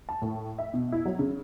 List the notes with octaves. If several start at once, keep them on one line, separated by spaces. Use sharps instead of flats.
A5
A2
E5
B2
E4
F#3
C#3